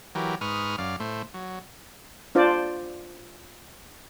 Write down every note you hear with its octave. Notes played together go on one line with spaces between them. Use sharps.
E3 F#3 G4 A#4
G#2 B4 C#6 D#6 F6
F#2 D5 F5
A2 A3 C5
F#3
D4 F4 C5 D5